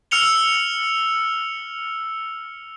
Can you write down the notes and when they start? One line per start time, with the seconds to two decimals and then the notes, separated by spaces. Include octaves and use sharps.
0.11 E6 F6 C#7 F7 G7